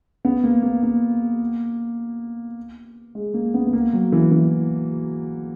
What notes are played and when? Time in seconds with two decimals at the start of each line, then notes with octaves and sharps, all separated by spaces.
0.25 B3
0.44 A#3
0.62 A#3
0.83 A#3
3.15 G#3
3.34 A#3
3.54 B3
3.67 B3
3.73 A#3
3.93 F#3
4.12 E3
4.31 E3